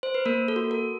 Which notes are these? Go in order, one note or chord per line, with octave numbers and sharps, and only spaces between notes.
C5
B4
A#3 A#4
A4
F#4
A#4